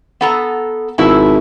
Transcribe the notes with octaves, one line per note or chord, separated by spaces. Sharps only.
B3 A4 A#5
G#1 B2 E4